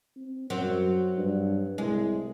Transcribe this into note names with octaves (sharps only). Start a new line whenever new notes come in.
C4
F#2 F#3 C4
G2
C2 G#3